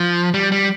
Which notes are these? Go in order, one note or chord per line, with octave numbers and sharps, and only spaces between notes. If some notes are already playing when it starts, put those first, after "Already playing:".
Already playing: F3
G3
G3